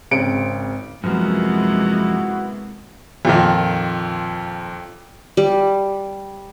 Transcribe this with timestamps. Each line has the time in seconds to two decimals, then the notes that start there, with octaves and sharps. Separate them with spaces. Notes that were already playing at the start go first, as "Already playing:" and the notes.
0.11 G#1 C#3 C4 C#7 D7
1.04 F#2 C3 F3 G#3 A#3 B3 E4 F#4
3.25 F2 A#2 D#3
5.37 G3